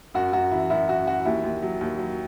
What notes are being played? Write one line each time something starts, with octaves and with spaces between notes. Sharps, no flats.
F#2 F#4
F#2 F#4
E3 E4
F#2 E4
F#2 F#4
E3 F#4
D#2 E4
D#2
F#3
D#2
F#3